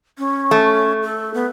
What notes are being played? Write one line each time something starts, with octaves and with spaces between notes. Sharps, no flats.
C#4
A3
A4
B3